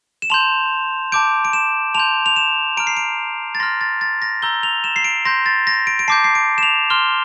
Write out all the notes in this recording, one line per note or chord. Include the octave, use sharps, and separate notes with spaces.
E7
A5 C6 G6 F7
A5 D6 G6 D7
D7
E7
A5 C6 G6 F7
F7
E7
A#5 F6 D7
C7
D7
A6
C6 F6 A#6
A6
A6
A#6
A#5 E6 G6 G7
F7
E7
C7
D7
C6 G6 A#6
A6
A#6
D7
D7
A5 D6 G6 C7
C7
D7
E7
F7
C6 F6 G7